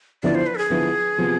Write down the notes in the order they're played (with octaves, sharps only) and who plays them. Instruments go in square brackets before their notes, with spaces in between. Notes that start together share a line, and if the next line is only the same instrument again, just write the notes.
[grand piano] D3 F3 B3 E4 B4 [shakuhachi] D5
[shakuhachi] C5
B4
A4
G#4
[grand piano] D3 F3 B3 E4 B4
C3 F3 B3 F4